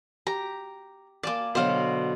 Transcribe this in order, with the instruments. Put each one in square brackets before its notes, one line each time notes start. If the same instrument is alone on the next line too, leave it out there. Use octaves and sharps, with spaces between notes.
[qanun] G4 [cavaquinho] A#5
[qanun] A#3 G#5 A5 [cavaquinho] D5 D6
[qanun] B2 D3 F#3 [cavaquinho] C5 F5